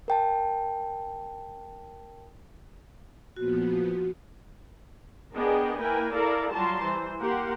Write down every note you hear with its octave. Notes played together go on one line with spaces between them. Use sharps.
A#4 G5 A5
A#2 F3 B3 F#4
B3 D4 G#4 A#4 D#5 G5
A#3 E4 A#4 B4 G5 G#5
E4 A4 A#4 D5 F5 A#5
F#3 G3 F4 A5 A#5 C6
E3 C5
A#3 G4 A#4 F#5 C6